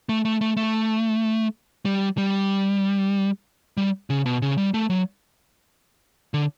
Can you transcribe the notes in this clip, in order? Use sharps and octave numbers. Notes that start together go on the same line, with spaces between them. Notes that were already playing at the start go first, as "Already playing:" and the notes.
A3
A3
A3
A3
G3
G3
G3
C#3
B2
C#3
G3
A3
F#3
D3